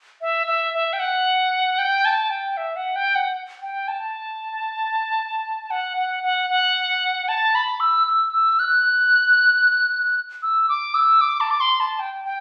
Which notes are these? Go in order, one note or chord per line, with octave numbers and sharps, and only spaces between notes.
E5
E5
E5
G5
F#5
G5
A5
G5
E5
F#5
G5
F#5
G5
A5
F#5
F#5
F#5
F#5
A5
B5
E6
E6
E6
F#6
E6
D6
E6
D6
A5
D6
C6
A5
G5
G5